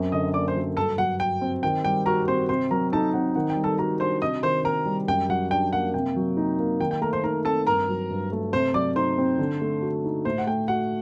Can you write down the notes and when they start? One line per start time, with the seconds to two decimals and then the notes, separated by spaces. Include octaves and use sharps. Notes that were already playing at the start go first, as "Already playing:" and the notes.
Already playing: F#2 F#3 C4
0.12 D3 D#5 D#6
0.34 A#3 D5 D6
0.48 C5 C6
0.56 F#3
0.77 G2 A4 A5
0.98 F#3 F#5
1.20 F#4 G5
1.41 C4
1.63 D#3 G5
1.84 G3 G5
2.06 F#4 A#4 A#5
2.28 C4 C5 C6
2.49 C3 C5 C6
2.71 F#3 A#4 A#5
2.93 D#4 A4 A5
3.13 C4 F#5
3.35 D#3 F#5
3.50 G5
3.57 G3
3.64 A4 A5
3.79 F#4 A#4 A#5
4.00 D4 C5 C6
4.22 C3 D#5 D#6
4.43 D#3 C5 C6
4.64 C4 A#4 A#5
4.86 G3
5.08 F#2 G5
5.29 F#3 F#5
5.51 D4 G5
5.73 A#3 F#5
5.94 C3 G5
6.16 F#3
6.37 D#4
6.59 A#3
6.80 D#3 G5
6.91 G5
7.01 A3 A#4 A#5
7.13 C5 C6
7.23 D#4 A#4 A#5
7.45 C4 A4 A5
7.67 G2 A#4 A#5
7.89 F#3
8.10 G2
8.32 A3
8.52 C3 C5 C6
8.74 F#3 D5 D6
8.96 D#4 C5 C6
9.18 C4
9.39 D3
9.61 A3
9.82 F#4
10.04 D#4
10.25 A2 C5 C6
10.38 F#5
10.47 A3 G5
10.68 F#4 F#5